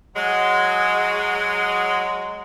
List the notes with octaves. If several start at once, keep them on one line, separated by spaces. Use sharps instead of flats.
F#3 G#3